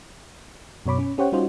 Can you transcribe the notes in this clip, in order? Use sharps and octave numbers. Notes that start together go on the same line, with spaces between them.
F#2 B2 C#5 B5 D6
C#4
C#4 G4 C5 C#5 F#5 G5
G3 C#4 D#4 F4 F#4 C5